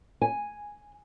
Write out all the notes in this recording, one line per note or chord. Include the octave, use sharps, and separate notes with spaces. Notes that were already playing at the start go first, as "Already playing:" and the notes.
G#5